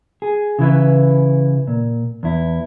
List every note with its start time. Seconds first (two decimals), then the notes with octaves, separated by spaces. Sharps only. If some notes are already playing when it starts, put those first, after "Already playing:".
0.22 G#4
0.59 C#3 E3 E4 B4
1.67 A#2
2.23 E2 E4